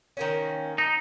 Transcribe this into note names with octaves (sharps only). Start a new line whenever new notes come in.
D#3 A#3 C#4
D#4